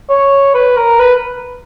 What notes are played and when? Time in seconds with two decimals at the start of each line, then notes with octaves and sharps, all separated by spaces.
0.09 C#5
0.54 B4
0.77 A#4
1.00 B4